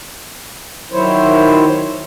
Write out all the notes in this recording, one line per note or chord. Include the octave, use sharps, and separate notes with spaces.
D#3 F#3 E4 C5 C#5